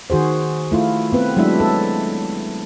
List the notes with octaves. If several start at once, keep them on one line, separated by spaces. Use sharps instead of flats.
D#3 F#4 G#4 C5
A3 E4 F4
B3 C4 B4
F#3 G#3 D4 E4 E5
A4